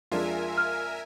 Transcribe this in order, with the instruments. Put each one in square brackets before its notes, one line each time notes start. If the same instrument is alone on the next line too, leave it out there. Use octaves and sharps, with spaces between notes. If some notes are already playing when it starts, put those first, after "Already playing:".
[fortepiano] F2 G#3 D4 [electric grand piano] F4 [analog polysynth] A#4 E5 G#5
[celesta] F6